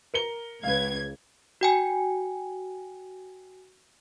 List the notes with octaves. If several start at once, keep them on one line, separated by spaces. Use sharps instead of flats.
A#4 C#7 G7
C#2 B4 F5 G#6
F#4 G5 G#5